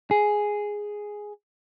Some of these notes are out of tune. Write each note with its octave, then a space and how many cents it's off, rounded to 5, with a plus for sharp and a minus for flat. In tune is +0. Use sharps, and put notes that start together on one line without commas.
G#4 +0